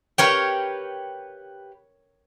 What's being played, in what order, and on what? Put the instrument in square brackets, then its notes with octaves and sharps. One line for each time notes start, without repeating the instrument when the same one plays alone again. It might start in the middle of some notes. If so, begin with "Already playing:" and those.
[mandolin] G4 B4 F5 [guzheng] A#4 C#5 G5